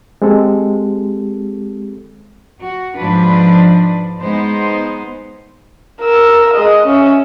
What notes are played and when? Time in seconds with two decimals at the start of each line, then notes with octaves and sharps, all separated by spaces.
0.22 G#3 C4 G4 A4
2.60 F#4
2.96 G#2 F3 D4 B4
4.21 G#3 B3 D#4 C5
6.02 A#4 E6
6.54 G#3 D#5
6.86 C#4 E5